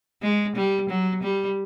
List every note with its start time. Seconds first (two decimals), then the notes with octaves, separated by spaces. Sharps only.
0.23 G#3
0.56 G3
0.90 F#3
1.23 G3